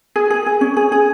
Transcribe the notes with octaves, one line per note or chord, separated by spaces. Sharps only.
G#4
G#4
G#4
C#4
G#4
G#4